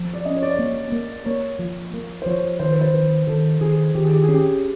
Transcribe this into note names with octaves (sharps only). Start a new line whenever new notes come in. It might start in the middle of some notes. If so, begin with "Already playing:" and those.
Already playing: F3
D5
C#4 D#5
C#5
D5
A#3 C#5
A#3
A#3 C#5
F3
A#3
C5
F3 C#5
D#3 C5
B4
C5
D#3 B4
D#3 A4
D#3 G#4
D#3 G4
G#4
G4
G#4
C#4
G4